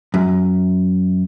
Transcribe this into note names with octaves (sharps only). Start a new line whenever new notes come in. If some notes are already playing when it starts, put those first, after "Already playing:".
F#2